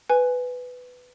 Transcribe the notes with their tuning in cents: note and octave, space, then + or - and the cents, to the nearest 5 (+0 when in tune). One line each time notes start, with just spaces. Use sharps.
B4 +10 G#5 +0